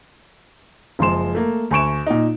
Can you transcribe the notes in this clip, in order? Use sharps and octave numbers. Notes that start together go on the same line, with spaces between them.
F#1 F3 G#3 C6 E7
A3 A#3
D2 G#5 C#6 D7 E7
A#2 D#4